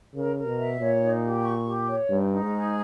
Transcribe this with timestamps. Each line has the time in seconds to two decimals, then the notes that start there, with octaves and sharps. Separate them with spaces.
0.14 C#3 A#4
0.36 A#4
0.47 B2
0.58 E5
0.79 A#2 C#5
1.01 D#4
1.23 G4
1.44 C#6
1.66 G4
1.87 C#5
2.09 G2 D#4
2.31 D#4
2.42 G#2
2.53 G#4